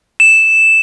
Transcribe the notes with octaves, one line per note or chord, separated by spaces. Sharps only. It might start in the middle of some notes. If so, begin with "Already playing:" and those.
E7